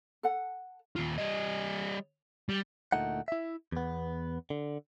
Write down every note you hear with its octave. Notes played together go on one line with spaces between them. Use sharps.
A4 F#5
D#2 F4
G3 D#5
G3
D2 A#2 A3 D#4 F#5
E4 E5
E2 B3
D3